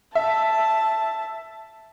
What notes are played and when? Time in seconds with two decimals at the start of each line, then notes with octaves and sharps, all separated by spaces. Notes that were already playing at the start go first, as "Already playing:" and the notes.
0.15 E5 A5